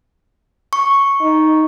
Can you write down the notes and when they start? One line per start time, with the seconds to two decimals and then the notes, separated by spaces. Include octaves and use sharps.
0.73 C#6
1.21 D#4